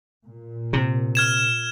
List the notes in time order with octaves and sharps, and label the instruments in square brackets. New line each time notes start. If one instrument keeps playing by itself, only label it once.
[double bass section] A#2
[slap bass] C3
[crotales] F6 G#6 E7